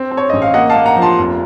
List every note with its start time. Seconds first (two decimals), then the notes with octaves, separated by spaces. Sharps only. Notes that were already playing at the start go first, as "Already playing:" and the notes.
Already playing: C4
0.11 C4
0.17 C#5
0.30 A1 D#5
0.42 F5
0.54 A#3 D#5 F#5
0.70 F5 A5
0.76 A#3
0.86 F#5 A#5
0.97 F3
1.02 A5 C6
1.18 F1